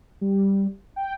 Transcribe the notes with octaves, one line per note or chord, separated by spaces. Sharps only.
G3
G5